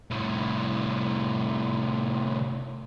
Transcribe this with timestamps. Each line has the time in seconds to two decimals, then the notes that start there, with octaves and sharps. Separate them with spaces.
0.11 C2 A2